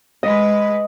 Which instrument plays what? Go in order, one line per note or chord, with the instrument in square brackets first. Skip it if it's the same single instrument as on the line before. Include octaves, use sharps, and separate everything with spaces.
[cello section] G#3 B4 [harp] D#5